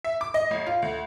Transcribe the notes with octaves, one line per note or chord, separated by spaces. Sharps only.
E5
D6
D#5
A1
F4
D2